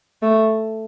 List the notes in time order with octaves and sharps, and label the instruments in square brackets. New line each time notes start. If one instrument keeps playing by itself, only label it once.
[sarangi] A3